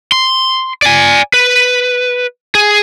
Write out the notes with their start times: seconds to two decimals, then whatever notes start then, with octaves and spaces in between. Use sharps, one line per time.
0.12 C6
0.82 D5 G#5
1.34 B4
2.55 G#4